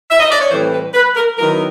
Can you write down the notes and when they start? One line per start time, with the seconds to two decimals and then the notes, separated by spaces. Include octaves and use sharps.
0.10 E5
0.20 D#5
0.30 D5
0.40 C#5
0.50 A2 E3 G3 C4 C5
0.72 B4
0.93 B4
1.15 A#4
1.37 D#3 F#3 B3 E4 A#4